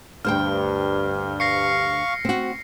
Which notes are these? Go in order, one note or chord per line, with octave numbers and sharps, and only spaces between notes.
D2 G2 C5 G5 F6
F5 C#6 A#6 C7 C#7
C4 F#4